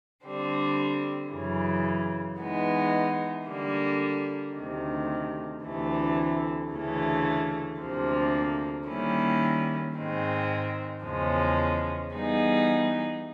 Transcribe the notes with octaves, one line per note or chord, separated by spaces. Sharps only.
D3 G3 C4
F#2 C#3 E3
E3 G#3 B3 D#4
D3 G3 A#3
D2 C3 D#3
D2 C3 E3 A3
D2 C#3 E3 A3
D2 C3 F3 A#3
D#3 G3 A#3 C#4 E4
G#2 D#3 G#3 C4
E2 C#3 F3 G#3 C#4
E3 G3 B3 D#4 G#4